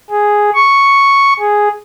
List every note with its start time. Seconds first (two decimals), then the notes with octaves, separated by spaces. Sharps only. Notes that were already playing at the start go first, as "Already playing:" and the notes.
0.10 G#4
0.54 C#6
1.39 G#4